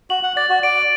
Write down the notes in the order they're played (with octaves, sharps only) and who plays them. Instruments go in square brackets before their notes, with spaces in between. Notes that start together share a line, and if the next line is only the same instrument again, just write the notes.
[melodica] F#4 [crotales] F#7
[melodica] F#5
[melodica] D5 [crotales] A6
[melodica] F#4
[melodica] D5 [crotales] D7